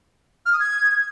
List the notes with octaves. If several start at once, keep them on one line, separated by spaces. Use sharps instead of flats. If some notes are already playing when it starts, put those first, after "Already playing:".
F6
D#6
G#6